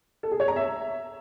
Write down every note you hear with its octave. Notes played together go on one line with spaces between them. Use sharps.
A4
G#4
C#5
A#5
E5